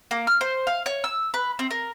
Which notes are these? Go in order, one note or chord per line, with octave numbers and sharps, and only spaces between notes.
A#3
F6
C5
F5
C#5
E6
B4
C4
A#4